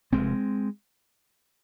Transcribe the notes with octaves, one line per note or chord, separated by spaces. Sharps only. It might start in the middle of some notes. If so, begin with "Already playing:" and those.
F1 F2 C3 G#3 C4